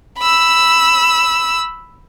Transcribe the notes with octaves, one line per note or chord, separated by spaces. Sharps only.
B5 E6